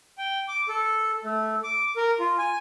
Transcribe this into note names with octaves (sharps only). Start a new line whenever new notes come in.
G5
D6
A4
A3
D6
A#4
F4
G#5